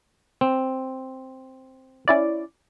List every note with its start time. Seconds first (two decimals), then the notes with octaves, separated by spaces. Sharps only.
0.41 C4
2.08 C#4 E4 D5